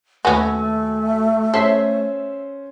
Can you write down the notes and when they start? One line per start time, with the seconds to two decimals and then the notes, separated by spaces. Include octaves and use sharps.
0.25 D#2 A3 B3 C#4 F#4 G#5
1.54 C#4 A4 C5 E5 C7